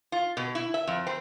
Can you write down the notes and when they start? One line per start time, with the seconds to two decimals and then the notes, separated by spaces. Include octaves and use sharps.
0.12 F4
0.37 B2
0.55 E4
0.74 E5
0.87 F2
1.07 C4